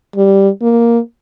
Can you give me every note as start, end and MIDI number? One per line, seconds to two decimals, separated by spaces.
0.16 0.49 55
0.62 0.99 58